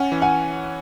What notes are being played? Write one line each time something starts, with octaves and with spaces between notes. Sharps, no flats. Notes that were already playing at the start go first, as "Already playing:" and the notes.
Already playing: C#4 F#5 G#5
E3
F#5 G#5